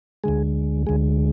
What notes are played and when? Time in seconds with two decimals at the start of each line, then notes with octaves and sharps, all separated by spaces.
0.24 D2 D3 G#3 G#4
0.87 D2 D3 G#3 G#4